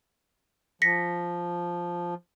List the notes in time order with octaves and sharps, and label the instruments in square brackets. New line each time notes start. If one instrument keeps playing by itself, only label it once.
[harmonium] F3 [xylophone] A#6 B6 C#7